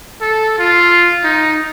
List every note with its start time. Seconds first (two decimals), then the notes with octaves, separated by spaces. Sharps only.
0.21 A4
0.59 F4
1.24 D#4